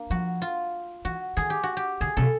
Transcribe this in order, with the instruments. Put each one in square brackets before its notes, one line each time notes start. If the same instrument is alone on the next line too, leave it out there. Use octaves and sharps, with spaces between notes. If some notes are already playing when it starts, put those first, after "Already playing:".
Already playing: [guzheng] A#3 D4
[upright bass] F3 [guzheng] F#4
[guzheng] F4
[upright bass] E3 [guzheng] F#4
[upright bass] D#3 [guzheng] G#4
[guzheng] G4
F#4
G4
[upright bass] D3 [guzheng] G#4
[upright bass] C3 [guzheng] A4